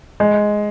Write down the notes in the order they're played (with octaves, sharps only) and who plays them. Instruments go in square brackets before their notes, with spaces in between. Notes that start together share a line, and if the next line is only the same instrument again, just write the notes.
[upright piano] G#3